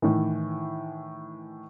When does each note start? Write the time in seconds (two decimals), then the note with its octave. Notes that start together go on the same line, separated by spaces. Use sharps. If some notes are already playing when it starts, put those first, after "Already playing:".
0.02 A2 D#3 E3